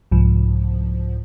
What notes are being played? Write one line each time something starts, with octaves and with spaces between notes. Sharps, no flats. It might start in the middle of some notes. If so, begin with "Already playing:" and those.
C2 G#2 F3